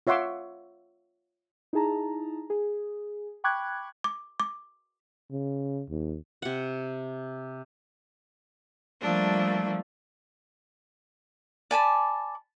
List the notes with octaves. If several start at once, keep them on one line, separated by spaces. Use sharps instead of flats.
F4 C#5 E5 F#5 C6 D6
D#4 E4 G#4 A5 A#5
G#4
G5 B5 C#6 D6 F#6 G#6
D6
D6
C#3
D#2
C3 F#5
F3 G3 A3 A#3 D4
D5 G#5 A5 B5